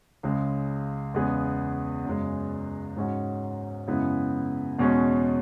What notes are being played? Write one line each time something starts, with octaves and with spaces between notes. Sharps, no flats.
C#2 C#3 G#3
E2 C#3 G#3 B3 G#4
F#2 C#3 G#3
G#2 G#3 C#4 F#4
F#2 C#3 G#3 B3 E4
E2 B2 G#3 C#4